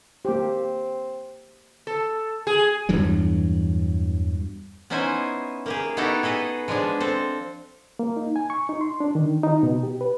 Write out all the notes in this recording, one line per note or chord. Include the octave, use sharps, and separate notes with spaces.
A#3 C4 G4
A4
G#4
E2 G2 E3 F#3
B3 C#4 D#4 E4 C5 G#5
A#3 G4 G#4
B3 D#4 E4 F#4 G4 A4
G#4 A4 B4 D#5
F3 G#3 B3 D4 G#4
C4 A4
A#3
D#4
G#5
C#6
D#4
C6
D4
D#3
D#4
B2
G4
B4